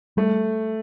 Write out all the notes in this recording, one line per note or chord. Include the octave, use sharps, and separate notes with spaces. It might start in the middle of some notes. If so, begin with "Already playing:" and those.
G3 A3